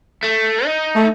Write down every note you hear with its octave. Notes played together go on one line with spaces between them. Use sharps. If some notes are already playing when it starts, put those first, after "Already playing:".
A3
D#4
A3